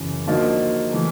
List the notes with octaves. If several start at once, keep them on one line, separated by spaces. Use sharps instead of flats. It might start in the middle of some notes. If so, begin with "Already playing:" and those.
Already playing: F#2 C#3 E3
D3 F3 A#3 D#4 F#4
E3 A3